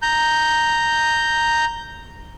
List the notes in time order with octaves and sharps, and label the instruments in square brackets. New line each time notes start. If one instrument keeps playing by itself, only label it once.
[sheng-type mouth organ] A#5 G6